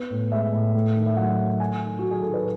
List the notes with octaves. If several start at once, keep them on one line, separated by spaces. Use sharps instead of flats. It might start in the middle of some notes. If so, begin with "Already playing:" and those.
Already playing: B3
A2
G#3 E5
A2
A3
D#3
E5
F#3 F#5
D#3
A3 G#5
D#3
F#3 F#4
G#4
D#3 A4
B4